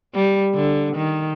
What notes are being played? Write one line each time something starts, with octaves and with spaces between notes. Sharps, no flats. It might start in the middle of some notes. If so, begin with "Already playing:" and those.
G3
D3
D#3